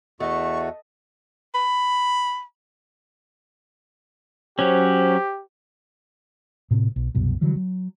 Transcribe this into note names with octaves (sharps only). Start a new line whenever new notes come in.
E2 A3 F#4 D#5 C#6
B5
F#3 C#4 G4 C5
A2 C3 C4
B1
C2 F#2 B2
D3 E3 F#3 G3
F#3